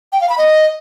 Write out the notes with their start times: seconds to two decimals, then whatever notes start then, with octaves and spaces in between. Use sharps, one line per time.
0.13 G5
0.21 F5
0.29 B5
0.38 D#5